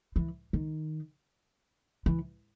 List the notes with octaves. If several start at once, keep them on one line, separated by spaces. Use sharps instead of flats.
E3
D#3
E3